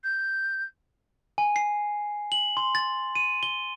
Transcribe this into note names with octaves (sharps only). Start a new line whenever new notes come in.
G6
G#5
C7
F#7
C6
A6
D#7
G7